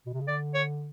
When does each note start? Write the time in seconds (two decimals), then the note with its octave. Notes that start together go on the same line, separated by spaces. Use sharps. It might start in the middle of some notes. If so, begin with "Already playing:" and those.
0.06 B2
0.13 C3
0.21 C#3
0.28 D3 D5
0.54 C#5